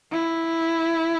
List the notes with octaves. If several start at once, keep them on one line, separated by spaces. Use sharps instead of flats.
E4